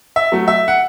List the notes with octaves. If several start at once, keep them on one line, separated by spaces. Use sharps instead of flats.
E5
F#3 A3
E5
F#5